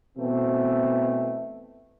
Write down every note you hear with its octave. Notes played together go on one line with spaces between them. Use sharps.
B2 E3 A3 C4